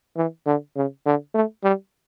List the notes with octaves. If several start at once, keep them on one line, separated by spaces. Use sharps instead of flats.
E3
D3
C#3
D3
A3
G3